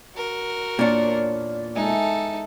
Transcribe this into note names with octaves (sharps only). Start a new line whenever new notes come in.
F#4 A#4
E2 A#2 D4 C#5 F6
G#3 D#4 A4 E5 G#5